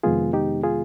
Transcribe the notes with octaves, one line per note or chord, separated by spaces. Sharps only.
F2 C3 D#3 G#3 B3 F4 G#4
D#4 G4
F4 G#4